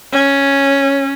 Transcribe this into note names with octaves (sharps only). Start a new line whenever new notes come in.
C#4